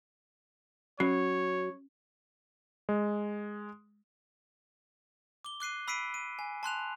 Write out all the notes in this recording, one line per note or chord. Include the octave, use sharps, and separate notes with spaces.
F#3 C#4 C#5
G#3
D6 G7
D6 F#6 C7 D#7
B5 E6 B6 C7 D7 D#7
D#7
G#5
A5 C6 F#6 F7